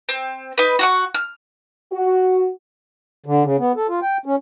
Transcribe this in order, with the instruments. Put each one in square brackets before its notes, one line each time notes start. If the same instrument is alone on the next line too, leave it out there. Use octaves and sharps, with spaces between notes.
[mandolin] C4
D#4 B4
F#4 F#5 C#6
F6
[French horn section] F#4
[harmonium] D3
C#3
B3
A4
F4
G5
C#4